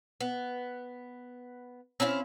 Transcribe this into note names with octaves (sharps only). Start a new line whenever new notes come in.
B3
C4 C#4 E4 F5